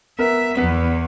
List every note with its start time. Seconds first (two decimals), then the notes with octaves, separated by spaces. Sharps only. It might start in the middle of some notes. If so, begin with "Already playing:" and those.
0.19 B3 A#4 E5
0.57 E2 B3 B6